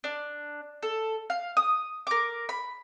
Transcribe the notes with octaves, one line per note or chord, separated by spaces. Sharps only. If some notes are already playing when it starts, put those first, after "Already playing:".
D4
A4
F5
D#6
A#4 D6
B5